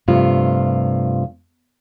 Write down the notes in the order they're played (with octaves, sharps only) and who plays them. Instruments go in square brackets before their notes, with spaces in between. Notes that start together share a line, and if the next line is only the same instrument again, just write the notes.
[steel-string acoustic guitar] G2 C3 F3 A3 F4